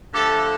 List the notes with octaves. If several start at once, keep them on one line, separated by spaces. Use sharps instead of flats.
D3 F3 A3 G4 A4